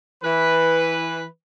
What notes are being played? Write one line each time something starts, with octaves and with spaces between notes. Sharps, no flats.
E3 B4